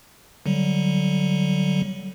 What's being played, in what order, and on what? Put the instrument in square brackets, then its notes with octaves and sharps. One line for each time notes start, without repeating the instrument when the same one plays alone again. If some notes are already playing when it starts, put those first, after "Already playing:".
[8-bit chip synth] D3 F#3 G3